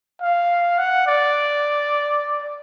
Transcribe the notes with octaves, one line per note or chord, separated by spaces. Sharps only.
F5
F#5
D5